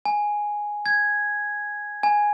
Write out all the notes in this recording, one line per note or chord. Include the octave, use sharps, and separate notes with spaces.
G#5
G#6
G#5